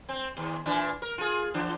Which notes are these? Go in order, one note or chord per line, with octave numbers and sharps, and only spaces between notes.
C4
D#2
A#2 E3 D4
A#4
F4 G#4
E3 D4